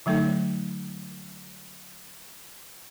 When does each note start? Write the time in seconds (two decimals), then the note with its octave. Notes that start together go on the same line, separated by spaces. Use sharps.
0.06 D3 F#3 A3 D#4 A4